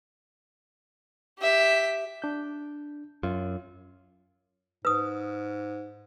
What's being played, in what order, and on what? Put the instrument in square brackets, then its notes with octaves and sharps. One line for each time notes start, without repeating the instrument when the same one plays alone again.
[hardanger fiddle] G4 E5
[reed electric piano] D4 G6
[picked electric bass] F#2 [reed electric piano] F4
[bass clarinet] G#2 [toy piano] B4 D#6